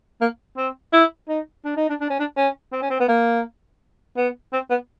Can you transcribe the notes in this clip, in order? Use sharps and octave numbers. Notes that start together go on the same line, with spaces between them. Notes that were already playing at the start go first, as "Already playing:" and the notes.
A#3
C4
E4
D#4
D4
D#4
D4
D4
C#4
D4
C#4
C4
C#4
C4
B3
A#3
B3
C4
B3